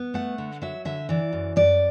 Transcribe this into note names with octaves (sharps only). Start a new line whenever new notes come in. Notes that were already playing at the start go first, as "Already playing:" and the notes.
Already playing: B3
A3 F#5
D3
F#3 E5
D3 E5
E3 D5
F#2
F#2 D5